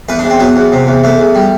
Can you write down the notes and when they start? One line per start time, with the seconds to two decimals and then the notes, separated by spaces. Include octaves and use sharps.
0.09 E2 B4
0.19 D4
0.24 E2
0.30 C4
0.39 F#3 B3
0.56 E2
0.72 C3
0.87 E2
1.04 E2 A3
1.19 E2
1.35 G3